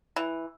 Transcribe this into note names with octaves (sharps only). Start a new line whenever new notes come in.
E3